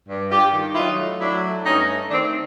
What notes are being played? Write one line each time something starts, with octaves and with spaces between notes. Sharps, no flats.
G2
G2 F4 G4
D#3
E4
F#3 D#4 F4
A3
F#3 D4 E4
A3
G2 C#4 D#4
A3
D#3 C4 D4